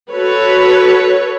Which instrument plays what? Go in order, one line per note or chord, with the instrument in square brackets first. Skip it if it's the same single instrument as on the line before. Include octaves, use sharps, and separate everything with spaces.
[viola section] F#4 A4 B4 C#5